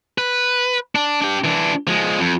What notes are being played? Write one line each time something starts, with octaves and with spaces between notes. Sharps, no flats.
B4
D4
D4 G4
E3 D4
F3 G#3
F2